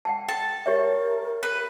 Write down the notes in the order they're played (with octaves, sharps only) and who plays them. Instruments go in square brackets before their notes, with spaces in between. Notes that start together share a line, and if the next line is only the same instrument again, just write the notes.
[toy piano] F#5 G5 A5
[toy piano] G5 [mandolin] A5
[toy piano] G4 C#5 E5 [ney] A#4
[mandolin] B4